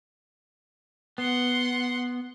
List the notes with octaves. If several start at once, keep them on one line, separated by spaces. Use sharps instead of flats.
B3 F#5 C6